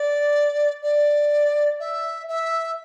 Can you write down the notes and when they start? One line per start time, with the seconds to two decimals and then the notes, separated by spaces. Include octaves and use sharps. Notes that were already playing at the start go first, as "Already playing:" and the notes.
Already playing: D5
0.83 D5
1.80 E5
2.28 E5